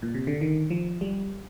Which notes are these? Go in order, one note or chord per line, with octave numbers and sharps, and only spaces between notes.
A#2
C3
D3
D#3
F3
G3